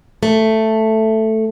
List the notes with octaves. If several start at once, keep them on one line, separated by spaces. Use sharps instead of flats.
A3